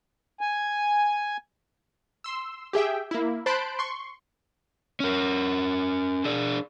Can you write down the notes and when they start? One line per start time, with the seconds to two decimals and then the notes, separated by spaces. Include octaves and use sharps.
0.41 G#5
2.24 C6 E6
2.73 G4 G#4 E5 G5
3.11 A#3 E4
3.46 C5 A5 B5 C6 F#6 D7
3.79 C6 C#6
5.00 C#4 A#4
6.24 D4 G#4 D5